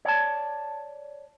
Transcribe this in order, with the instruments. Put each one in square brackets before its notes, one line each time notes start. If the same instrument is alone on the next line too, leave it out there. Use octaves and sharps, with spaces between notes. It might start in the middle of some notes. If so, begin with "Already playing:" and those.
[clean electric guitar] C#5 D5 G5 A5